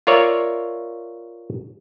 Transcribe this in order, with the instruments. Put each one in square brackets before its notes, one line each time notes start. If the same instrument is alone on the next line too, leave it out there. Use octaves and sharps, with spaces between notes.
[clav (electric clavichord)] F4 A#4 C#5 D5 E5